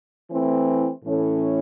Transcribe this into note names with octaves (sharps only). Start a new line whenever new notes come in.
E3 A3 C4 E4
A2 E3 A3 C#4